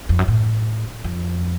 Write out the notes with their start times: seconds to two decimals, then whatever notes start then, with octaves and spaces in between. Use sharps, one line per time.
0.09 F2
0.19 F#2
0.28 A2
1.04 F2